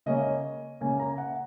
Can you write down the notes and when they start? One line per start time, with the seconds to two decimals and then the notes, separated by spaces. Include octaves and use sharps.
0.06 C#3 A#3 C#4 D#5
0.81 C#3 A#3 C#4 G#5
1.00 A#5
1.18 F#5